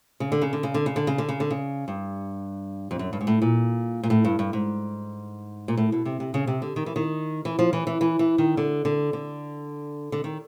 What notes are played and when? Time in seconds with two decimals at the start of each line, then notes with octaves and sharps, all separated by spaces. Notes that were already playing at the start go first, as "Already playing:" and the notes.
0.20 C#3
0.32 D3
0.42 C#3
0.53 D3
0.63 C#3
0.74 D3
0.86 C#3
0.96 D3
1.07 C#3
1.18 D3
1.29 C#3
1.40 D3
1.51 C#3
1.88 G2
2.91 F2
2.99 F#2
3.13 G2
3.21 G#2
3.27 A2
3.42 A#2
4.03 A#2
4.10 A2
4.24 G2
4.39 G2
4.53 G#2
5.68 A#2
5.77 A2
5.92 B2
6.05 C3
6.20 C3
6.34 C#3
6.47 C3
6.62 D3
6.76 D#3
6.86 E3
6.96 D#3
7.45 E3
7.59 F3
7.73 E3
7.87 E3
8.01 E3
8.19 E3
8.38 D#3
8.57 D3
8.85 D3
9.13 D3
10.12 D3
10.24 D#3